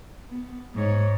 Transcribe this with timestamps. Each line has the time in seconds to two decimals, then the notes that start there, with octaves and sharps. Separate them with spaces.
0.29 B3
0.74 G#2 C#5